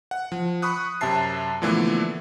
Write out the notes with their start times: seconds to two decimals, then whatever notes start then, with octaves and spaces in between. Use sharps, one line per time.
0.11 F#5
0.32 F3
0.62 B5 C#6 D#6 F#6
1.01 F#2 C3 E5 A5 C7
1.62 A#2 D3 E3 F3 A3 B3